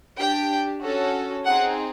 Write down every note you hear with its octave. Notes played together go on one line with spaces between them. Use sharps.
D4 G4 G5
C#4 F#4 A4
C4 D#4 G#4 F#5